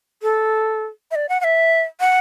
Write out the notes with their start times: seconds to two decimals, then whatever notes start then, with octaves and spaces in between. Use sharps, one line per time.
0.22 A4
1.11 E5
1.15 D5
1.29 F#5
1.41 F#5
1.44 E5
2.00 F#5